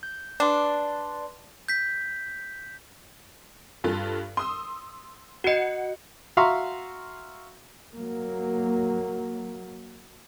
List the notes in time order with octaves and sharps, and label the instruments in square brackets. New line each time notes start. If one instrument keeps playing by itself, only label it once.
[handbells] G6
[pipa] D4 [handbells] B4 D5 C6
[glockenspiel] G6 B6
[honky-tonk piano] G2 F4 A4
C6 D#6 E6
[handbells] F#4 D#5 [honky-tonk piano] F#5 C#7
[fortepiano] F#4 E5 F5 A#5 C6 C#6
[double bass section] F#3 A#3